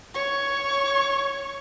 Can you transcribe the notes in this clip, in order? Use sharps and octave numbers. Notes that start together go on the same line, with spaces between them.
C#5 C#6